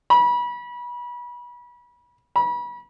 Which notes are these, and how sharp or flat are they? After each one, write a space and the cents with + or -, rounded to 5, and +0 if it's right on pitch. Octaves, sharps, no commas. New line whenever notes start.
B5 -30
B5 -35